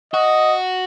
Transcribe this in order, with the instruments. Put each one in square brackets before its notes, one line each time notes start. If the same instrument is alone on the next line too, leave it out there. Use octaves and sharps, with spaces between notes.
[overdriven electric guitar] F#4 [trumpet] D#5